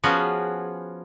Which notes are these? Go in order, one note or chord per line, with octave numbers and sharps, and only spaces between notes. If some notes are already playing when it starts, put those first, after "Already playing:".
F3 B3 C#4 F#4 G#4